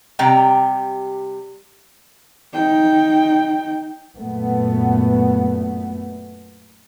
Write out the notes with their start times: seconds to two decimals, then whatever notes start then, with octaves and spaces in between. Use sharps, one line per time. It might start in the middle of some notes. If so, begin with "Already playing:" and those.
0.19 C3 G3 G4 G5 A#5
2.53 D#4 G5
4.19 F#2 A#2 A3 B3